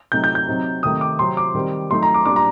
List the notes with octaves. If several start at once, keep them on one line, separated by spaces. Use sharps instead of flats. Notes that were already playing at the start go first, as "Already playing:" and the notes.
C3 F#3 A3 D#4 G6
G6
G6
C3 F#3 C4 D#4
C3 D#3 A3 D#6
D6
C3 F#3 C4 C6
D6
D#3 G3 C4
F#3 A3 D#4 C6
A#5
D6
A#2 G3 D4 D6
A#5